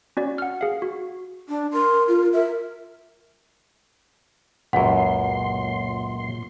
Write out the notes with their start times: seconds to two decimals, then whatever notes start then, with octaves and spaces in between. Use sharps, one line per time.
0.17 C#4 F#4 D5
0.38 F#5 F6
0.61 G#4 F5
0.82 F#4
1.49 D4
1.73 A#4 C6
2.08 F4
2.33 A#4 E5
4.73 C#2 F#2 A#2 F#5 C6